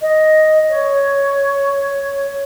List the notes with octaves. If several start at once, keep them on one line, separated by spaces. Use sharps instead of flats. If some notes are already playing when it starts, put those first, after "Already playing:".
D#5
C#5